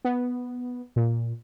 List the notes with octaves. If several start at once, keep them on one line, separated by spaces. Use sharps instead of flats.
B3
A#2